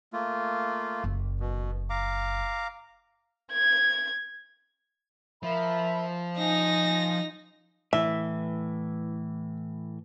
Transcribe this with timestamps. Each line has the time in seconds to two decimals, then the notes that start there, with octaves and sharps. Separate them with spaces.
0.13 A3 A#3 F4
1.04 F#1
1.40 B2
1.90 F5 A#5 D6
3.51 G#6
5.43 F3 A#4 E5 B5
6.38 D#4 G#5 A#6
7.93 A2 E3 E5